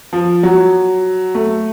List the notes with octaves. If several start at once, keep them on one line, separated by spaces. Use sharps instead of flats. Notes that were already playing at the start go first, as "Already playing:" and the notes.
F3
F#3
A3